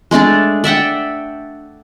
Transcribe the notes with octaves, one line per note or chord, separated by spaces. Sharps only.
G#3 A3 D4 D5
D5 E5 F#5 G5